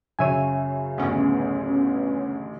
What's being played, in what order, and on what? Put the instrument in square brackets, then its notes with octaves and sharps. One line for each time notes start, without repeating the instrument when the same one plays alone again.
[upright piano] F#2 C#3 D#7 [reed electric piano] C#5 E5 G#5
[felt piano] A1 D2 [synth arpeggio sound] B3 C#4